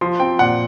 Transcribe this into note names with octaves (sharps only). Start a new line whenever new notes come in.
F3 C6
C4 G5
A#2 F#5